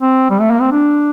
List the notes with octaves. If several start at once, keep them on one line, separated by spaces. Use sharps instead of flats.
C4
G3
A3
A#3
C4
D4